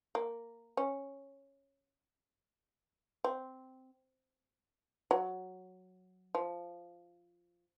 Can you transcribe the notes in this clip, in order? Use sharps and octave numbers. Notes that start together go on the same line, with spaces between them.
A#3
C#4
C4
F#3
F3